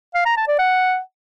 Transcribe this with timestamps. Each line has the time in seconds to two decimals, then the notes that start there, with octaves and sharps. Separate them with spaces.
0.15 F5
0.26 A#5
0.37 A5
0.48 D5
0.59 F#5